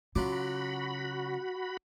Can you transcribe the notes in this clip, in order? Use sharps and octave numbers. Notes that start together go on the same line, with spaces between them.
C#3 F#3 F4 F#4 B5 D6